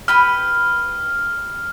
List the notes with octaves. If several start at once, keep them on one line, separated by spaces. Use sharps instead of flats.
G4 B4 G5 F6